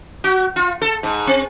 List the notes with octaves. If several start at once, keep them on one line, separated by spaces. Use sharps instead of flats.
F#4
F4
A4
G#2
C4